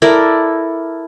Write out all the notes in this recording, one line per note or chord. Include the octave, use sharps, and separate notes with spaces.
E4 A4 A#4 D5